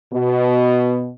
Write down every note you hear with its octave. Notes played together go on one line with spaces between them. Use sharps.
B2